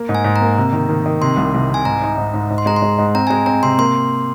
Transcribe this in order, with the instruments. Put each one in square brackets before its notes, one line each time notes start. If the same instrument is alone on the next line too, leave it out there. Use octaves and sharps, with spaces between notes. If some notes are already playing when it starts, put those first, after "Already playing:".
Already playing: [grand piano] A#3
G#2
[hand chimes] G#5
[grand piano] G#2
[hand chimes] A#5
[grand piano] A#3
C3
D#3
D#3
D#3
[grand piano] C3 [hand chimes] C6
[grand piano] C2
C2
[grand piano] C3 [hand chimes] G#5
[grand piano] G#2 [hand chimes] A#5
[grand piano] D#4
G#2
G#2
G#2
[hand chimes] C6
[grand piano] G#3 [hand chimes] A#5
[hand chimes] C6
[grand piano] G#3
G#2
[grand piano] C4 [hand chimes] A#5
[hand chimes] G#5
[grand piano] G#3 [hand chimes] A#5
[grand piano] C4 [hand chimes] A#5
[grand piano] C3 [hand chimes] C6
[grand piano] A#3 [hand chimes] C6